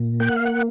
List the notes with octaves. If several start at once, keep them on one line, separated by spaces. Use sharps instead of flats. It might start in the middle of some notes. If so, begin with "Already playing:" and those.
Already playing: A#2
A#3 G5
F#5
F5
F#5